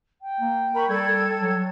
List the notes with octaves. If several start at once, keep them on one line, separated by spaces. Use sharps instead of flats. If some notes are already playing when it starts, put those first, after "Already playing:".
G5
A#3
A#4 B5 C#6
G3 A4 G#6
F#3